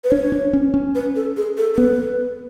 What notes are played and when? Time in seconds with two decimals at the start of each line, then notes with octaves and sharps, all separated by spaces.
0.04 B4
0.11 D4 C#5
0.32 D4
0.53 C#4
0.74 C#4
0.95 B4
1.16 A4
1.37 G#4
1.57 A4
1.74 A4
1.78 B3 B4